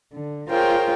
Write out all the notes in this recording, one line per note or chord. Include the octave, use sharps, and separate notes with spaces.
D3
F4 G#4 A#4 C5 C#5 G5